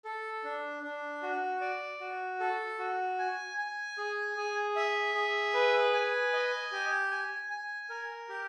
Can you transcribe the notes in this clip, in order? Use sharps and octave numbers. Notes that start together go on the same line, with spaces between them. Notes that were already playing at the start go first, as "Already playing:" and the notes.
A4
D4
D4
F#4
D5
F#4
A4
F#4
G#5
G#5
G#4
G#4
E5
G#4
B4
G#5
D#5
G4
G#5
G#5
A#4
G4